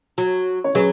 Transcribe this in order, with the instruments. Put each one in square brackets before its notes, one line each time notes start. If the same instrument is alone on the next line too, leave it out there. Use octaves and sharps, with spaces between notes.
[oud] F#3
[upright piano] C#5
[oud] F#3 [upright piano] G#4 B4